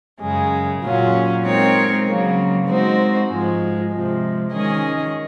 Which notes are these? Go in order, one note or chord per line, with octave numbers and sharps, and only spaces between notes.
F#2 C#3 G#3
A#2 F#3 C#4 F4
G#3 C4 D#4 A#4 C#5
C#3 F#3 A#3
G#3 C4 D#4 F#4 C5
G#2 F3 G#3
C3 F3 G#3
D#3 G#3 C#4 G#4 D#5